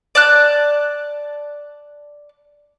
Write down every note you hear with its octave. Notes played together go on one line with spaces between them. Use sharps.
D5 A5 F#6